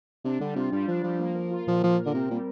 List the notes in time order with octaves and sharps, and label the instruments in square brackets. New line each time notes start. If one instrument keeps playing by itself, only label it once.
[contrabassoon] C3 [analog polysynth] D4
[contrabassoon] D3 [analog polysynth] G3
[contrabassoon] C3 [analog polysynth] F4
[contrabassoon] G2 [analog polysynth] G3
[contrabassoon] F3 [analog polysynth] D4
[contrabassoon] F3 [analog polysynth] G3
[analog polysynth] A#3
A#4
F4
[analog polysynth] A#2 [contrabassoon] F3
[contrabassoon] F3 [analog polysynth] A#3
[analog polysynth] A#4
[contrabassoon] D3
[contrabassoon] C3 [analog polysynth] C4
[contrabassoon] A#2 [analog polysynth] G3